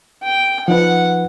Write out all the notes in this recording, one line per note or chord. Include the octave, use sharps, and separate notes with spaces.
G5
F3 D#4 B4 F#5